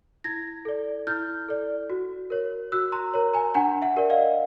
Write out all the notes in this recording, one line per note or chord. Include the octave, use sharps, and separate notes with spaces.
E4 G#6 A#6
A4 D5
E4 F6 G6
A4 D5
F#4
A#4 C#5
F#4 E6 F#6
A#5 C6
A#4 C#5
G#5 A#5
D4 F#5 G#5
E5 F#5
G4 A#4 D5
D#5 F5